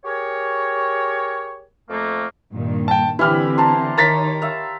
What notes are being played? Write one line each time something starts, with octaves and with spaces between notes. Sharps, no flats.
G4 G#4 A#4 C#5
F2 A3 A#3
G2 A#2 D#3
G5 A5
D3 E3 C4 E4 G4 B5 F6
A5 A#5 C6
D#3 A#4 C#5 A#5 A6 B6
E5 F5